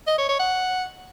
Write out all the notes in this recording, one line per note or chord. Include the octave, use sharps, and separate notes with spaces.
D#5
C#5
C#5
F#5